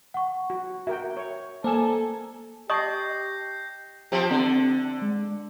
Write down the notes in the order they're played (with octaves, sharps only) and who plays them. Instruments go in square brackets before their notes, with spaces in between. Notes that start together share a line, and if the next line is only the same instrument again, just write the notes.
[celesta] F#5 C#6
[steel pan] F#4
[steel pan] F#4 A#4 G5 [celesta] E5
[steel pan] C#5
[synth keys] A#3 G#5 [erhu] A4 [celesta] C5 [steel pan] D5 E6
[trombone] G4 [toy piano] D#5 [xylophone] A5 C#6 D#6 [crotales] G6 A#6 C7
[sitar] F3 C4 G4 [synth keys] E5 A#5
[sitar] D3 [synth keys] C4
[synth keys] G#3